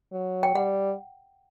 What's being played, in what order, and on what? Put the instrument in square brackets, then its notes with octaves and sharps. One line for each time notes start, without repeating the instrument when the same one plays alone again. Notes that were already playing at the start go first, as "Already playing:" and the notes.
[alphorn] F#3
[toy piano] G5
[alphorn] G3 [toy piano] F#5